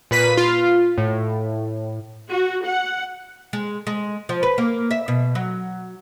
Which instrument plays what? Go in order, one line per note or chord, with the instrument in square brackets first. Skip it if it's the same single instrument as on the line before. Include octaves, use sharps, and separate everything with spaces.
[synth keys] A#2 B4 B6 D#7
F4
A2
[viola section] F#4
F#5
[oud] G#3
G#3
F3
B4
A#3
E5
B2
F#3